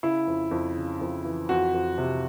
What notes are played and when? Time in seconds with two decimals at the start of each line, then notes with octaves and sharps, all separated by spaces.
0.03 C#3 E4
0.27 F2
0.51 F2
0.77 C#3
1.01 F2
1.25 E3
1.49 F2 F#4
1.74 F2
1.98 C3